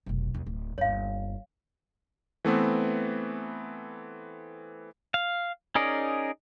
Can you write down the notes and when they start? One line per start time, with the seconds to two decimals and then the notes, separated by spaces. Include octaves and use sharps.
0.06 F1 B1
0.34 D#2 F3
0.46 D1
0.78 G1 D#2 C#5 F5
2.45 E3 A3 B3 C4
5.14 F5
5.75 C#4 D#4 G#4 A#4 D5